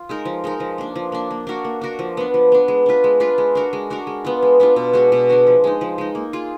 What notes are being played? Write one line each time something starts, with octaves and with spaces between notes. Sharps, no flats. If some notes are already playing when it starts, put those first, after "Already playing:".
Already playing: F4
G#3 D#4 A#4
F3
G#3 D#4 A#4
F3
A#3 D4
F3
A#3 D4
A#3
D4 F#4 A#4
A#3
D4 F#4 A#4
F3
B3 D4
F3
B3 D4
G#3
D4 F4 B4
G#3
D4 F4 B4
G#3
D4 F#4 A#4
G#3
D4 F#4 A#4
G#3
B3 D4 F4
G#3
B3 D4 F4
B2
G#3 D4 F#4
B2
G#3 D4 F#4
F3
G#3 D#4
F3
G#3 D#4
A#3
F4 G#4